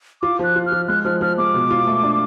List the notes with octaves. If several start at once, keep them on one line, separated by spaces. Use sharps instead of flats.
F4 D6
F3 F#6
F4
F6
F3
G#3 F#6
F3 F6
F3 F6
G#3 D6
B2
F4
A3
D4